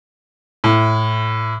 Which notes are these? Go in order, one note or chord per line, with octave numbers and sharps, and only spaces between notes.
A2